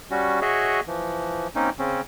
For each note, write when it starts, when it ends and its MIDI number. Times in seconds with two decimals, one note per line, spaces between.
0.11 0.40 55
0.11 0.40 61
0.11 0.40 66
0.42 0.80 66
0.42 0.80 68
0.42 0.80 73
0.42 0.80 75
0.42 0.80 76
0.87 1.47 52
0.87 1.47 53
1.55 1.70 58
1.55 1.70 60
1.55 1.70 61
1.55 1.70 63
1.79 2.01 49
1.79 2.01 60
1.79 2.01 61